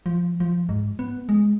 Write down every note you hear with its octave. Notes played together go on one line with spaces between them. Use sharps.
F3
F3
G#2
B3
G#3